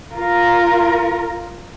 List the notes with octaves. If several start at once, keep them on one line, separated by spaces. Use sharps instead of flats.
F4 A#4